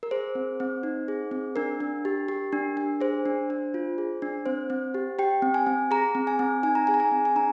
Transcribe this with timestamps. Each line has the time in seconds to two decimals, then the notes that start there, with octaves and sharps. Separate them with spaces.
0.03 A#4
0.11 G#4 C5
0.35 C4
0.60 C4
0.83 D#4
1.08 G#4
1.31 C4
1.56 D4 A#4
1.80 D4
2.05 G4
2.28 G4
2.52 D4
2.77 D4
3.01 G#4 C5
3.25 D4
3.50 D4
3.74 F4
3.98 G#4
4.22 D4
4.46 C4 C5
4.70 C4
4.94 G4
5.19 G4 G5
5.42 C4
5.54 G#5
5.67 C4
5.91 G#4 A#5
6.15 C4
6.27 G#5
6.39 C4
6.63 D#4 G#5
6.75 A#5
6.87 G#4 G#5
6.94 A#5
7.00 G#5
7.12 C4
7.25 G#5
7.36 D4 A#5